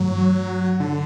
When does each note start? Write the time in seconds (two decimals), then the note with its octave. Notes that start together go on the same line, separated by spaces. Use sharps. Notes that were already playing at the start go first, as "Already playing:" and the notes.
Already playing: G2 E3 F#3 A3 C4
0.80 D3